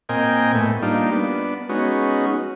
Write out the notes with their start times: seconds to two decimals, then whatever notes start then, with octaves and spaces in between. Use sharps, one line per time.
0.09 A#2 C4 A#4 D#5 G5 G#5
0.55 A2 A3 B3
0.82 G3 A#3 D4 D#4 F4
1.11 B3 D4
1.69 G#3 B3 C#4 D#4 F#4